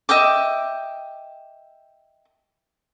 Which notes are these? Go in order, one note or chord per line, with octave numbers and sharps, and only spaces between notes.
D#5 E5 G5 D6